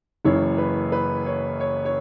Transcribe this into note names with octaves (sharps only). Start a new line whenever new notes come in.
F#1 F#2 E3 C#5
B4
B4
C#5
C#5
C#5